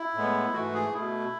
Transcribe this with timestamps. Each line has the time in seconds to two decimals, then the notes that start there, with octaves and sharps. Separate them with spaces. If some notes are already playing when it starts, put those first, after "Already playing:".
Already playing: E4
0.14 A2 G#3 B3
0.53 G#2 E3 A3 F#4
0.73 G#4
0.92 B2 A3 E4